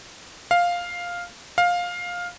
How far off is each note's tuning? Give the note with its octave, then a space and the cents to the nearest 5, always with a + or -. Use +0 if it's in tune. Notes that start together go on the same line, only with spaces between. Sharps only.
F5 +5
F5 +15